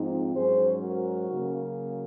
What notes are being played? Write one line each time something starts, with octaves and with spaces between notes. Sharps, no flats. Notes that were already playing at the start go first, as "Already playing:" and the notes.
Already playing: G#2 F3 C4 D#4
G#2 F#3 C#4 G#4 C5
F#4 A#4
C#3 F#3 A#3